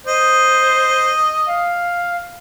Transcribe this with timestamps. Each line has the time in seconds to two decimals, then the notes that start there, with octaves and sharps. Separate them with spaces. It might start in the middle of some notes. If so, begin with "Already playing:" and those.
0.07 C5 D#5
1.48 F5